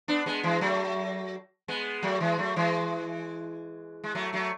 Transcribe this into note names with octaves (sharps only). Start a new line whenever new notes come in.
B3 D4
G#3 B3
E3 G#3
F#3 A3
G#3 B3
F#3 A3
E3 G#3
F#3 A3
E3 G#3
G#3
F#3 A3
F#3 A3